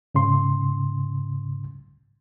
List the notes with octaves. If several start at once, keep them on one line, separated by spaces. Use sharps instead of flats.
G#2 C#3 C6